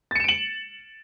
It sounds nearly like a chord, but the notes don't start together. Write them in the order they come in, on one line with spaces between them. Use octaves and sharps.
A6 C#7 E7 D7 F#7